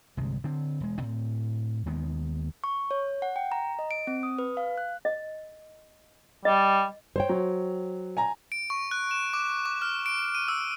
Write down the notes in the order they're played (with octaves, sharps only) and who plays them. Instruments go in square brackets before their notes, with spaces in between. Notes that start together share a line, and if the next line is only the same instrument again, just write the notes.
[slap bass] G1 C2 C3 G#3
D3 C4
E1 G#3
A2 C4
D#2 D#3 G#3 B3
[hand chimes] C#6
C#5
F#5
G5
A#5
D#5
D7
C4
D#6
B4
F5
F#6
[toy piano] D#5
[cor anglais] G3 [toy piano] D#5
[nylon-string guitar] C5 C#5 G5
[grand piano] F#3
G#5 A#5
[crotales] D7
C#6
F#6
E7
D6
D6
F6
D7
D#7
E6